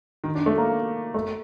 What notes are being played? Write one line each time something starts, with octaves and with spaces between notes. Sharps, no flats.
D#3
D4
A3
A#3
A3